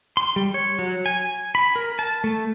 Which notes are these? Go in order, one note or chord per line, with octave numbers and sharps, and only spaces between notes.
C6
G3
C#5
F#3
G#5
B5
A#4
A5
A3